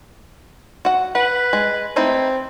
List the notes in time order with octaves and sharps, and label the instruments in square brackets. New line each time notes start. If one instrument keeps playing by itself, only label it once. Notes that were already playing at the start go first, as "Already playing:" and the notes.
[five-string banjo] F#4 F#5
[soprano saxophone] B4 [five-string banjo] F#5
[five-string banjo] G#3
[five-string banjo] A3 D#4 E4 [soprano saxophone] C4